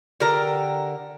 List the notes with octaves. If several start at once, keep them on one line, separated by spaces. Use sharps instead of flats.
D3 G4 A#4 A#5